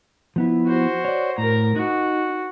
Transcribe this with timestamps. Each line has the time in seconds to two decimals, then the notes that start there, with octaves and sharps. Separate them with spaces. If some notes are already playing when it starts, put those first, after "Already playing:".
0.36 F3 B3 E4
0.66 F#4 C5
1.05 C#5 D5
1.38 A2 A#4 A#5
1.76 D#4 F#4